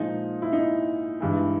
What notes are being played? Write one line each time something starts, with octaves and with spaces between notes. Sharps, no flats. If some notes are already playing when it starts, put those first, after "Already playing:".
Already playing: A#2 F3 G#3 D#4
E4
D#4
G2 E3 G#3